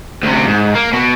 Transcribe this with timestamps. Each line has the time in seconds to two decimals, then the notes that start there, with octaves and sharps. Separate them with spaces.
0.23 D2 C3
0.47 G#2
0.75 A#3
0.93 B2